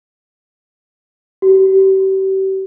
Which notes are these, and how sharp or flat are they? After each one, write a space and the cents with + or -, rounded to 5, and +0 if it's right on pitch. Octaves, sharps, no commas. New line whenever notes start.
G4 -35